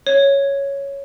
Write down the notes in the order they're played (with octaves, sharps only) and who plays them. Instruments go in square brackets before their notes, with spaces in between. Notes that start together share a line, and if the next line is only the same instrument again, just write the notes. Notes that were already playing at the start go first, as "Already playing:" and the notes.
[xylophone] C#5